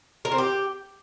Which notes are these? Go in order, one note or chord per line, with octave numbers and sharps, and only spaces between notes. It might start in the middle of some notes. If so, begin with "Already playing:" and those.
A#4
C4
G4